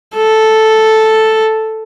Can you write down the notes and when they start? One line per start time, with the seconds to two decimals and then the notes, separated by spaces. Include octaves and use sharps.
0.16 A4